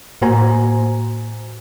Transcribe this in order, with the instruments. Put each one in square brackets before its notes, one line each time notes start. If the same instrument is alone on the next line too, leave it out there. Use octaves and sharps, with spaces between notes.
[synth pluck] A2 A#3 F#4 C5 G#5 A#5